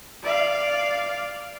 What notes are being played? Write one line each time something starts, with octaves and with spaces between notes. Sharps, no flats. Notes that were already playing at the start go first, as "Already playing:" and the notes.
D5 F5